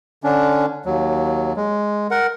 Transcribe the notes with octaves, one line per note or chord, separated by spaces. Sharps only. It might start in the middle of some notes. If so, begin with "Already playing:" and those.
D3 C#4 D4
D#2 F#3
G#3
A#4 F#5